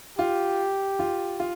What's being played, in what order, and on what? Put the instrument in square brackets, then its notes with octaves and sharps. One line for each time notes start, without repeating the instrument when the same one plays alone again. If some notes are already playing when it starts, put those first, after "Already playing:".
[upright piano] F4 [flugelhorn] G4
[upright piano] F4
F4